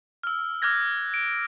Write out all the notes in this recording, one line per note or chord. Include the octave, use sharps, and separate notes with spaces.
E6 F6
D6 F6 F#6 G#6 A#6
D7